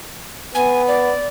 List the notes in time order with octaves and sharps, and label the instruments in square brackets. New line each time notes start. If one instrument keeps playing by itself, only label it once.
[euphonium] B3 [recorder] G#5
[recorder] D5